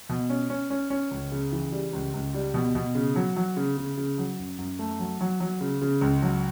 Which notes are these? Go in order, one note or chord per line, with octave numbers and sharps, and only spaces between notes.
B2
C#4
C#4
C#4
C#4
C#2
C#3
E3
G3
C#2
C#2
G3
B2
B2
C#3
F#3
F#3
C#3
C#3
C#3
F#3
F#2
F#2
A3
F#3
F#3
F#3
C#3
C#3
C#2
F#3